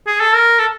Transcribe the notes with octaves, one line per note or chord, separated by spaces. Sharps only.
G#4
A4
A#4
A4